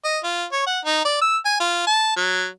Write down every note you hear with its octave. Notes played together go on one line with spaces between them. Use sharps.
D#5
F4
C#5
F#5
D#4
D5
E6
G#5
F4
A5
F#3